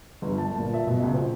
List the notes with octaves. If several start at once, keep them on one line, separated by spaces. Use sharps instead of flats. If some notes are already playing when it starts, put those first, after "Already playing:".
G1
A5
A#2
E5
B2
C#2
C5